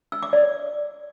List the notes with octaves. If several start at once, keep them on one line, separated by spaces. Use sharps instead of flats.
E6
D6
D5